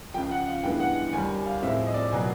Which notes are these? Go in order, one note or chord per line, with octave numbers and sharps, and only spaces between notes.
C#2 C#3 F3 G5
F#5
F5
G2 E3 G#3 B3 G5
F#5
D#2 D3 G3 G#5
F5
A2 F3 G#3 C4 E5
D#5
D5
D#5
B2 F#3 A#3 G#5